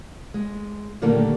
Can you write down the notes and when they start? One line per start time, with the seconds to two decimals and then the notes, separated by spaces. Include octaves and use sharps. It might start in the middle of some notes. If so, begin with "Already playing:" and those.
0.34 G#3
1.02 A#2 D3 D#3 G3 A3 A#3